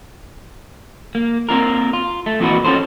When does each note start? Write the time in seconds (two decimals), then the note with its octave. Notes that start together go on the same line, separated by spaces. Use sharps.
1.15 A#3
1.49 A#3 C4 F4 A#4
1.93 F4
2.26 A3
2.40 F2 A#2 E3 C4 F#4 B4
2.65 C#4 F4 A4 C5